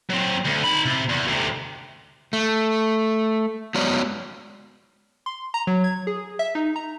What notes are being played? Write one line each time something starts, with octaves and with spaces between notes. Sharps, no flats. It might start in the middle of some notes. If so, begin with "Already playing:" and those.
F#3 C4
D2
D#4 B5
C3
E2
D2 C3
A3
F#3 G#3 B3 C#5 D5
C6
A#5
F#3
G#6
G#4
E5
D#4
A#5